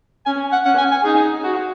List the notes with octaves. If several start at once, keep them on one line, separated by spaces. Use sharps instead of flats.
C#4 G#5
F#5
C#4 F#5
G#5
G#5
D#4 G#4
F#4